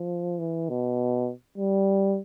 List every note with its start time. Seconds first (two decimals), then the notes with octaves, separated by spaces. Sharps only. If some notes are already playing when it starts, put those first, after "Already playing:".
Already playing: F3
0.39 E3
0.69 B2
1.58 G3